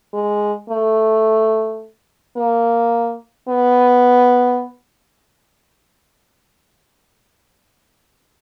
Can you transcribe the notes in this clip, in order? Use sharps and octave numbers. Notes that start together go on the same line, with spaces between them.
G#3
A3
A#3
B3